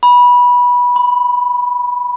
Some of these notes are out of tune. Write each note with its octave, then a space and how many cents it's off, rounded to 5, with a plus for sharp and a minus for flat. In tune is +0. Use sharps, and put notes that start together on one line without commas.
B5 -15
B5 +25